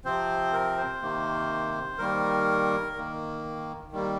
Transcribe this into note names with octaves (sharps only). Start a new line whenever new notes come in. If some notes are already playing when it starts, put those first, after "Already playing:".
C3 F3 C4 C5
A#4
C5
C3 D#3 A#3
D#3 G3 A#3 A#4
D#3 A#3
D#3 G3 A#3